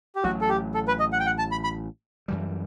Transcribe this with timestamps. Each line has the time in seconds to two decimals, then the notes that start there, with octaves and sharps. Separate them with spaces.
0.15 G4
0.23 A1 A2 F#3 F#4
0.41 A4
0.49 G4
0.74 A4
0.88 B4
0.99 D#5
1.13 F#5
1.20 G5
1.26 F#5
1.38 A5
1.51 B5
1.64 B5
2.28 F#2 E3 G3